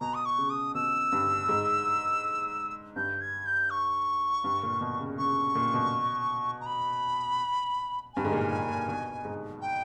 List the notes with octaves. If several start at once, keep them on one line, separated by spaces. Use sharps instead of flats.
B2 A#5
D#6
C#6
C#3
D#6
B2 E6
G2
G#2
G2 G6
G#6
G6
C#6
G2
A#2
B2
C#3
C#3 C#6
A#2
B2
A#5
B5
G2 G#5
G#2
A#2
G#2
A#2
B2
G#2
G5